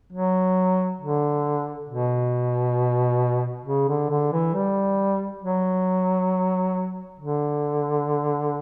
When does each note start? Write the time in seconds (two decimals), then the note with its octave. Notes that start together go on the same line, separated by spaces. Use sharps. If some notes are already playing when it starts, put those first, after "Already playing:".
0.13 F#3
1.01 D3
1.89 B2
3.65 C#3
3.88 D3
4.10 D3
4.32 E3
4.54 G3
5.42 F#3
7.19 D3